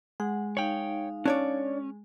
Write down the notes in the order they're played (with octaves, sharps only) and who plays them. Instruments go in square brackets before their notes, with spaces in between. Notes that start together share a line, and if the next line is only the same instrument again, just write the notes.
[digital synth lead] G#3 [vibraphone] F#5
[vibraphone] D#4 F5 [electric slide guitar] C#5 G5
[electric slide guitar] C#4 [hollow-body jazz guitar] D4 C#5 D5